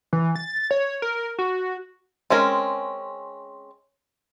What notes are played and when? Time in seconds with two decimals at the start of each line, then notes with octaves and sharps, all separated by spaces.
0.13 E3
0.36 A6
0.71 C#5
1.02 A#4
1.39 F#4
2.30 G#3 C4 C#4 A#4